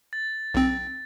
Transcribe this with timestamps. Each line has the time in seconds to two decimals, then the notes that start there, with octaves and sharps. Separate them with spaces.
0.13 A6
0.54 B1 C4